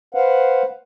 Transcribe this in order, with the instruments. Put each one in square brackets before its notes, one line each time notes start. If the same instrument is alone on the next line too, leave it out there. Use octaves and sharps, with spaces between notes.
[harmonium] B4 C5 F5 F#5